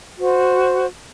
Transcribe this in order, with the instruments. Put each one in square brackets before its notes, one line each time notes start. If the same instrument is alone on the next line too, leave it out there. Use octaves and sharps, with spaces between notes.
[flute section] F#4 C5